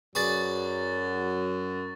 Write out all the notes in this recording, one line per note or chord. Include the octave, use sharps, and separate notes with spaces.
F#2 F#3 G#4 B4 D5 C#6 A6